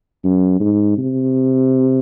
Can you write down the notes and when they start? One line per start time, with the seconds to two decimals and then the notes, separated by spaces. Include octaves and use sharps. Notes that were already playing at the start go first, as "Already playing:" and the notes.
0.25 F#2
0.60 G#2
0.97 C3